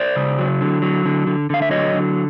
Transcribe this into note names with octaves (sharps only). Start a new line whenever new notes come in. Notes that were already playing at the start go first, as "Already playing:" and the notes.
Already playing: C5 D5
C#3
F#3
D3
F#3
D3
D3
D3 F5
E5
F#3 C#5 D#5
D3